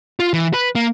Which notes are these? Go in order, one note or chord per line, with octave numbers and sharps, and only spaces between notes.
F4
E3
B4
A#3